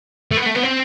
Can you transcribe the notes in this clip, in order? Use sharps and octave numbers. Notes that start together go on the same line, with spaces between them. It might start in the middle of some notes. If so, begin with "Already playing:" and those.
A3
B3
A3
B3
C4